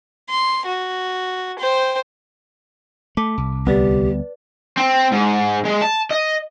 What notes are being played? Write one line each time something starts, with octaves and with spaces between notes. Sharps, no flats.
C6
F#4
C5 G5
A3 A5 D6 B6
C2
D2 G3 B3 G4 B4 D5 A6
C4
G#2
G#3
A5
D#5